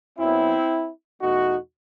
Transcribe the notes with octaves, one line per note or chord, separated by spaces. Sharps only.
F#2 F#3 B3 C4 E4
E2 B2 A3 D#4 F#4